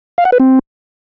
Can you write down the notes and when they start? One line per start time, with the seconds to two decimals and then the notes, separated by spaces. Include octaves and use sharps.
0.18 F5
0.25 F#5
0.32 B4
0.40 C4